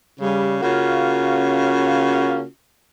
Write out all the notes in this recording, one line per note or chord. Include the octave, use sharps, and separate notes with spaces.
C#3 G3
C#3 A#3 C#4 F4 F#4